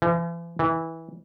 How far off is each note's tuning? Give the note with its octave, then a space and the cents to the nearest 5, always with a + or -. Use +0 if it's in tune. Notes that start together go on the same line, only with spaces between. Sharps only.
E3 +45
E3 -15